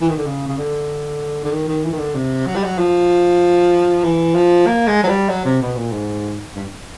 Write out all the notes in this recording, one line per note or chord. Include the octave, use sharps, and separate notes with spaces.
E3
D#3
D3
C#3
C#3
D3
D3
D#3
D#3
E3
D#3
D3
C3
F#3
G3
F#3
F3
E3
F3
A#3
G#3
F#3
G3
F#3
C3
B2
A#2
G#2
G2